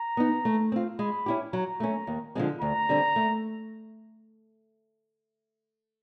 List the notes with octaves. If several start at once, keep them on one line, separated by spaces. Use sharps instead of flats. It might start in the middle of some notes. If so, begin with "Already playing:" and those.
Already playing: A#5
B3 D#4
A3
C4 F4
G#3 B5
C#4 E4 G4
F#3 A#5
A3 C#4
D#2
D3 F3 G#3 C4
D2 A#5
D3 G3 C4
A3